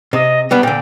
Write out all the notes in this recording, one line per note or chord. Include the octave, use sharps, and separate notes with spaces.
C3 D#5
G3 B3 D4 B5
A#2 D3 G5